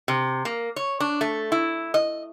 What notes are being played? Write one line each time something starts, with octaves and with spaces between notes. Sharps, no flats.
C3
A#3
C#5
D4
A3
E4
D#5